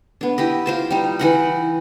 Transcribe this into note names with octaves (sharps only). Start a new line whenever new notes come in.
B3 D4
E4 G4 D#5
F4 C5 A5
G3 D#4
E3 D#4 F#5